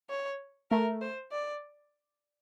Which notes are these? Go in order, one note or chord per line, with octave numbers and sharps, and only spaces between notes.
C#5
A3 A#4
C5
D5